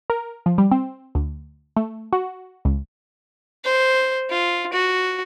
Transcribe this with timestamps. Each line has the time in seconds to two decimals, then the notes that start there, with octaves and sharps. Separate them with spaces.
0.10 A#4
0.46 F3
0.58 G3
0.71 C4
1.15 D2
1.77 A3
2.13 F#4
2.65 C#2
3.64 C5
4.29 F4
4.73 F#4